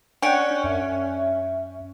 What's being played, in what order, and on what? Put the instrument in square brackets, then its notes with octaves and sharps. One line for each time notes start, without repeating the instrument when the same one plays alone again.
[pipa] C#4 [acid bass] D4 [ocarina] D5 [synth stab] F#5 G5
[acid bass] F#2 [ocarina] E5